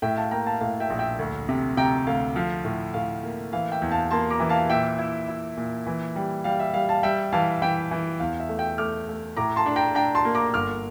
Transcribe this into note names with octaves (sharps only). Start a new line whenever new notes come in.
A2 E5 G5
F5 A5
A#3 G5 A#5
F5 A5
A2 F5
E5 G5
A#1
E5 G5
D2
C3
C3 G5 A#5
D2 F5
F3 F5
A2
A2 F5
A#3
E3 F5
E5 G5
E2
F5 A5
A#3 A5 C6
A#5 D6
E3
F5 A5
A#2 E5 G5
E4
E4
A#2
E3
G3
G3 F5
E5
G3 F5
F5 A5
G3 E5 G5
E3 F5 A5
E3 E5 G5
E3
E2 F5
E5
A3
E5 G5
A3 D6 F6
A3
A2 A#5 D6
A5 C6
D4
G5 A#5
D4 G5 A#5
A5 C6
A#3
A#5 D6
G1 D6 F6